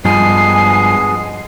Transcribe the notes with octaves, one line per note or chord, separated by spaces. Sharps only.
G2 F3 G#3 B3 G#4 G#5 C7